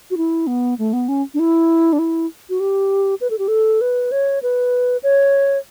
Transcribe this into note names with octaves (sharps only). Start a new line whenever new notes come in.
F#4
E4
B3
A3
B3
C#4
D4
E4
D4
E4
F#4
G4
B4
A4
G4
A4
B4
C#5
B4
C#5